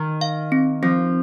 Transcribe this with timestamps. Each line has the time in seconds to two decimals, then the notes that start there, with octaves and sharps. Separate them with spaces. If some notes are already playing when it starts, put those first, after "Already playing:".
Already playing: D#3
0.21 F5
0.52 C4
0.83 F3 C4